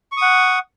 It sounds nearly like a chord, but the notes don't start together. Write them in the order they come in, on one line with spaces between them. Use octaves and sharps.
C#6 D#6 F#5